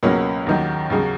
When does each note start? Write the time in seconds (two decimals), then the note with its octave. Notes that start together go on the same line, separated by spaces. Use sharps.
0.03 C#2 B2 F#3 A#3 C#4
0.47 D#2 D#3 F#3
0.90 D#2 C#3 F#3